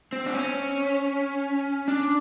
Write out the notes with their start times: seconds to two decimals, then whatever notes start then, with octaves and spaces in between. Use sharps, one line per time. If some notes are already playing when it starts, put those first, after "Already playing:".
0.13 C4
0.26 D4
0.34 C#4
1.88 D4